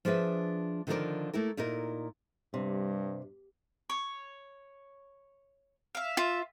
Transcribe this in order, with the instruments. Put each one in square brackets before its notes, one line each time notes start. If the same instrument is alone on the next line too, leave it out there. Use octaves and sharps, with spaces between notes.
[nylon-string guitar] F3 D4 G#4 B4 E5
D3 D#3 F3 A4 A#4 D5
A3 A#3 E4 A#4
A#2 D#4 E4 A#4
[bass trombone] G2 [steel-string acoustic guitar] C3 [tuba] G3
[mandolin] C#5
E5 F5
[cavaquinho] F4 [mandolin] E5